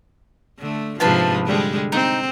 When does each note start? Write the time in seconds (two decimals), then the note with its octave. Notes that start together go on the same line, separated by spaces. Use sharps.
0.59 D3 A3
1.00 G#2 C3 F3 D4 B4 A5
1.45 D3 G3 G#3
1.92 C4 D#4